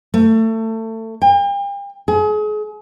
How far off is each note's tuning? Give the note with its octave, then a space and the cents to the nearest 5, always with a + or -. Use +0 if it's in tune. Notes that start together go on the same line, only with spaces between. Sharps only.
A3 +25
G5 +40
G#4 +35